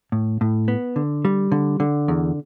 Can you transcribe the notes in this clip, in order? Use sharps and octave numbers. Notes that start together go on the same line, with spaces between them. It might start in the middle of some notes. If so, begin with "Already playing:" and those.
A2
A2
B3
D3
G3
D3
D3
E2